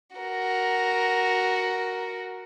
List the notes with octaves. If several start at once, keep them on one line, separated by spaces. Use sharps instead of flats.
F#4 A#4